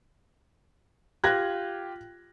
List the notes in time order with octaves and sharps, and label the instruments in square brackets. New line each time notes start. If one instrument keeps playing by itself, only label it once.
[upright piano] F4 G4 [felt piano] F#6 G#6 A#6